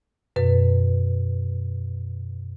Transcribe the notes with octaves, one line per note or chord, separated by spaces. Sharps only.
F#2 B2 B4